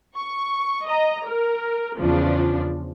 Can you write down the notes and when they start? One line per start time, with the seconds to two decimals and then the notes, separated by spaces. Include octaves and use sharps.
0.16 C#6
0.87 D#5 A#5
1.27 A#4
1.99 E2 C#3 F3 D4